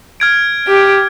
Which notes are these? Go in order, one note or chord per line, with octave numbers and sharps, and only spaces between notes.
F6 G#6 D7
G4